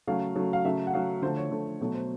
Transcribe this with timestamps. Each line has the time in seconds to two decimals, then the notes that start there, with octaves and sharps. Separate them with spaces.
0.08 C#3 F#3 A3 F5
0.36 C#3 F#3 A3
0.53 F5
0.64 C#3 F#3 A3 E5
0.87 F#5
0.93 C#3 F#3 A3 F5
1.22 D3 F3 A3 C5
1.37 C#5
1.51 D3 F3 A3
1.81 B2 F#3 A3 C#5
1.94 C5